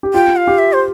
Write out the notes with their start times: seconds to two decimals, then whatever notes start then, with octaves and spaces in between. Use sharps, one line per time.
0.03 G4
0.14 F4 G5
0.36 F5
0.47 G4
0.58 E5
0.73 C5